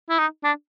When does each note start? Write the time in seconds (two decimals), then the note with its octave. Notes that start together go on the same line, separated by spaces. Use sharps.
0.10 E4
0.18 D#4
0.44 D4